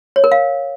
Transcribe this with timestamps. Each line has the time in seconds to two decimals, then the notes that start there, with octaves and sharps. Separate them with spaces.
0.16 C#5
0.24 A#4
0.32 F5